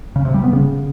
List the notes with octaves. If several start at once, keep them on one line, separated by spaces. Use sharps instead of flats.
C#3
C3
G3
B3
C#3